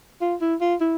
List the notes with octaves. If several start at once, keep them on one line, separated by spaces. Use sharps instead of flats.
F4
E4
F4
E4